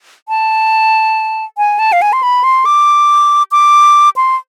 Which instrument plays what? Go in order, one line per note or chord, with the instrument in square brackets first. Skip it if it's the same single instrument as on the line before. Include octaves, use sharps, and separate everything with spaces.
[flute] A5
G#5
A5
F5
G#5
C6
B5
C6
D6
D6
C6